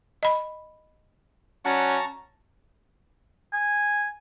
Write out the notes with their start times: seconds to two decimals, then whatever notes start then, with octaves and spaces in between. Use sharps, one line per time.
0.23 D#5 B5
1.65 F#3 C#4 D5 F#5 A5 A#5 C#6
3.53 G#5